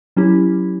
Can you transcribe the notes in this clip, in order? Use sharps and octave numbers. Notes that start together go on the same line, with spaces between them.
F#3 C#4 E4 G4